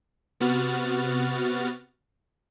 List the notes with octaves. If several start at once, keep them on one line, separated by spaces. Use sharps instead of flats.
C3 B3 F#4 F6 A6